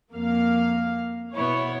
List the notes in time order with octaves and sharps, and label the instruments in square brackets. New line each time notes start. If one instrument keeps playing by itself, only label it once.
[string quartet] F2 [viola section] A#3 F5
[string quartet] B2 B3 E4 [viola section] C#5